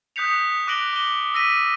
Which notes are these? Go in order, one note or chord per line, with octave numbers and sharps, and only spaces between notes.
D#6 F#6 G6 B6 C#7 F7
D6 F#6 A#6 D7 F#7 G7
D6 G7
E6 A#6 B6 D#7